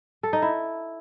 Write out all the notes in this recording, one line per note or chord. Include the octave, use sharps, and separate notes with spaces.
A4
D#4
E4